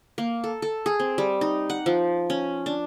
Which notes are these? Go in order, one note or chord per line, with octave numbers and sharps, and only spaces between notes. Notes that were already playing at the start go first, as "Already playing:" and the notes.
A#3
A4
A4
G#4
C4
G3
D#4
F#5
F3
C#4
D4